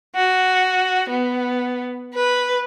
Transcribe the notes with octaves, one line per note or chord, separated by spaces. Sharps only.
F#4
B3
B4